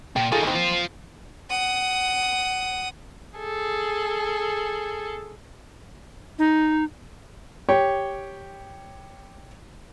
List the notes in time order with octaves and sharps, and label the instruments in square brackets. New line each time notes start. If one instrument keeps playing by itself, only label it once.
[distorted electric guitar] A#2 [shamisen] G5
[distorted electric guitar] D#3 E3 [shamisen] F4 G#4 A4
[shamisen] A#3 C4
[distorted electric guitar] F4 C5
[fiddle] F#5 D#6
[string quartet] G#4 A4
[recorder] D#4
[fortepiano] G4 C#5 G5